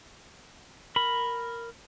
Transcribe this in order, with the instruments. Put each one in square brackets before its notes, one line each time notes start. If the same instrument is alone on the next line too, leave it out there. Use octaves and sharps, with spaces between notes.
[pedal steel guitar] A#4 B5